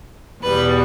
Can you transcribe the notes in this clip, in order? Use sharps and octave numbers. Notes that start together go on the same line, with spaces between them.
E2 B2 G3 B4